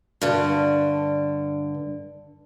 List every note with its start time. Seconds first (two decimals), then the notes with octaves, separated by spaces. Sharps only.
0.21 G2 D3